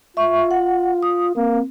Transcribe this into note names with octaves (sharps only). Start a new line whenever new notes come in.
F4 E5 C#6
F#5
D#6
A#3 C4